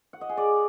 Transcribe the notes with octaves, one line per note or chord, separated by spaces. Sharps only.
F#5
D#5
G#4
D5